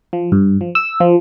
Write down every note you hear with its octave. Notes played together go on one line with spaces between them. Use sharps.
F3
G2
F3
E6
F3